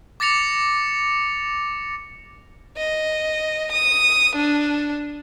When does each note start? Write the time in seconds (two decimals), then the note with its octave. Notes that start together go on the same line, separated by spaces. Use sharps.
0.20 D6 A6 A#6 C#7 F7
2.77 D#5
3.72 D#6
4.36 D4